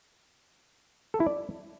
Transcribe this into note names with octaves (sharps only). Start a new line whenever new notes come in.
A4
E4
D5